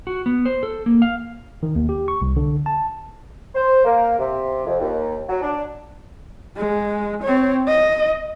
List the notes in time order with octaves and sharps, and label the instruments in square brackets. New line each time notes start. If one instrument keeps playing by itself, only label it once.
[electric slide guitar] F#4
B3
C5
A4
A#3
F5
[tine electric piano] D#3
D#2
G4
C#6
C2
D3
A5
[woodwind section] C5
A#3
C3
F2
D#2
F#3
D4
[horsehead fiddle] G#3
C4 C#5
D#5